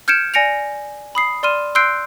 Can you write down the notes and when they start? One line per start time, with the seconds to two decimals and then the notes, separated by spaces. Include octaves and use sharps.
0.08 F6 G6 G#6 C#7 D7 E7
0.34 D5 G#5 A#6 C#7 D7 F7
1.15 B5 D#6 C7
1.43 D5 C6 F6 D#7 E7
1.75 C6 E6 F#6 G6 C7 D7